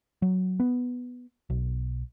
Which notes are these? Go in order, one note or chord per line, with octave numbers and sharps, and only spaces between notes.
F#3
B3
B1